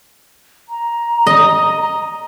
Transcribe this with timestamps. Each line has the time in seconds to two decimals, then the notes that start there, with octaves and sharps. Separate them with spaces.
0.69 A#5
1.27 D#5